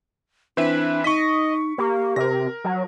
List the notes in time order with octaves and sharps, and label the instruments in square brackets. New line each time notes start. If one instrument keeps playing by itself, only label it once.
[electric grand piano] E3 C4 E5 [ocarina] D4 [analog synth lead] B4
[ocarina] D#4 [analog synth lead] D#5 [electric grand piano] C#6 B6
[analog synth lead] A#3 [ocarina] G4
[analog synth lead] C3 [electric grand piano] A#4 A#6
[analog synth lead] F#3